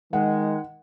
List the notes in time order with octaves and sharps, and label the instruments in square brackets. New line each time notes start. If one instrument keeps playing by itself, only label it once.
[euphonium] D#3 [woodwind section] G#3 [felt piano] F#5